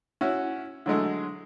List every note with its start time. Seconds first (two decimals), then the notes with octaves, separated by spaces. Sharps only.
0.21 C#4 E4 F#4
0.86 D3 F#3 G#3 A3